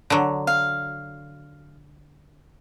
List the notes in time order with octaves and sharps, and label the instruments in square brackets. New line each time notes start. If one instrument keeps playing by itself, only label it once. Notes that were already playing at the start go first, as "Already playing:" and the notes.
[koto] D3 F#3
[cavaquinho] F5